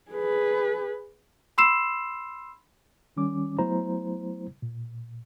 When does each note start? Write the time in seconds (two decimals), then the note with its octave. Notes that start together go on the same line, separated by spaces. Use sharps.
0.11 G#4 B4
1.58 B5 C6 E6 C7 E7
3.17 D#3 G3 C#4 D6
3.59 F#3 A3 B3 E4 C5 A#5
4.62 A#2